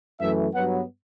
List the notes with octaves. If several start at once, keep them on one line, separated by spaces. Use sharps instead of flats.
F#2 E3 A3 E5
G2 F#3 B3 F#5